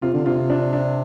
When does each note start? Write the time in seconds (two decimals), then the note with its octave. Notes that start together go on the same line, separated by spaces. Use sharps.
0.02 C3 F4
0.14 D3
0.26 C3 F4
0.50 D4
0.73 D4